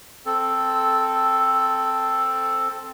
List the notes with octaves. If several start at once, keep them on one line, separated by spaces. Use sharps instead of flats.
C4 A4